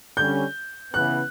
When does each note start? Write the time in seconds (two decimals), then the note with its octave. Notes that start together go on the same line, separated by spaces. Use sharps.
0.17 D3 G3 C#4 G6
0.94 C#3 E3 B3 F#6